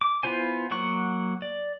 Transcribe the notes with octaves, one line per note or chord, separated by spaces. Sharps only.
D6
B3 E4 F4 C5 G#5
F#3 A#3 F#5 C#6
D5